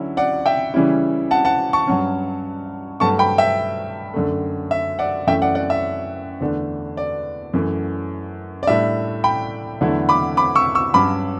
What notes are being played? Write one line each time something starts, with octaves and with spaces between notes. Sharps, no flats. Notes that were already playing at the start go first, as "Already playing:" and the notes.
Already playing: D3 F#3 C#4 E4
D5 F#5
E5 G5
C#3 E3 G3 C#4 E4
F#5 A5
F#5 A5
A5 C#6
G2 F#3 C#4
G2 F#3 A3 A5 C#6
G5 B5
E5 G5
F#2 D3 A3
E5
D5 F#5
F#2 E3 A3 C#4 E5 G5
D5 F#5
D5 F#5
E5
E2 D3 A3 D4
D5
F#2 E3 A3
D5
A2 G3 D4 E5
G5 B5
E2 D3 F#3 A3 E4
B5 D6
B5 D6
C#6 E6
C#6 E6
G2 F#3 C#4 B5 D6